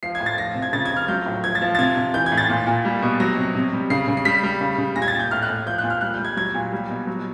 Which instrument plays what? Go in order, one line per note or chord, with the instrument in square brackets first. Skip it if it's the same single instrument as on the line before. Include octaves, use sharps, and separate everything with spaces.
[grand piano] F3 C7
G#6
A2
A6
F3 A#6
C3
G#6
C#3 A6
G#6
F3
F6
F#3 G6
A2
F3 G#6
A6
F3
A6
C3 G#6
C3
E3 G6
G#6
A2
A6
A#2
A#2
G3
B2
F#3 A#6
C3
C3
G3
C#3 C7
C#3
C7
G3 B6
G3
C#3
C#3
A#2 A#6
G#6
A6
A#2
G6
A2 F6
F#6
A2
F3 G6
F#6
A#2
F6
G3 F#6
G6
G3
G#6
F#3 G#6
A#2
G3
B2
F#3